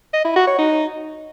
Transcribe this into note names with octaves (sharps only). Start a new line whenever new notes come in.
D#5
E4
F#4
C#5
D#4